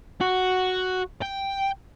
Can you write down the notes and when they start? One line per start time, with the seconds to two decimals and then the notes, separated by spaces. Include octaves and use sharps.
0.21 F#4
1.22 G5